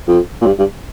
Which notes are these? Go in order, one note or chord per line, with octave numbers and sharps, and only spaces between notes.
F2
A#2
G2
G2